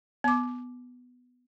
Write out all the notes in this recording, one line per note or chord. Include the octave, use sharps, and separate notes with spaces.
B3 D6